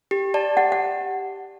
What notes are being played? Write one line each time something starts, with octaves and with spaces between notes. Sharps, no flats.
G4
D5 A5
G4 F#5
F#5